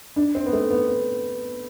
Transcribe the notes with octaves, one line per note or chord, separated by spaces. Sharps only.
D4
C4
B3
A3
B3
B3